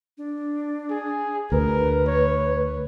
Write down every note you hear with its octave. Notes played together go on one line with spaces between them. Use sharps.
D4
G#4
D2 A#4 B4
C#5